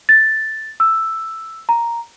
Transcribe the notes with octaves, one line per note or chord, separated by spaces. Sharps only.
A6
E6
A#5